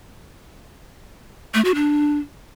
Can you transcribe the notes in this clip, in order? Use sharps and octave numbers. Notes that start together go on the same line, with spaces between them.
A3
F#4
D4